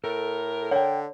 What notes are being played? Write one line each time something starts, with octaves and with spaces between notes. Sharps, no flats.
A2 A4 A#4
D3 C#5 F#5 G5